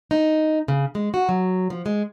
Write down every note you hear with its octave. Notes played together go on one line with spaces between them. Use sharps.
D#4
C#3
G#3
F#4
F#3
F3
G#3